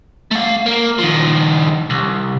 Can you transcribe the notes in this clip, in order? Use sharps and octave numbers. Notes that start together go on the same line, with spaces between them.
A3 F5
A#3
D#3 F3
C2